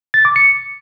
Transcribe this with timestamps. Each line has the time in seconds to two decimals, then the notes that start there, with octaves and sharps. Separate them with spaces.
0.14 A6
0.25 D6
0.36 C#7